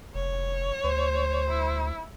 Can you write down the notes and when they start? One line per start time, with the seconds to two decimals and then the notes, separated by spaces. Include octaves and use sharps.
0.15 F1 C#5
0.84 D2 C5
1.50 E4